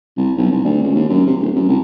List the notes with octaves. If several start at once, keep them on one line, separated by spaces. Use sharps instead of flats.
C2
B1
C2
D2
C#2
D#2
F#2
C3
D1
F#2
C2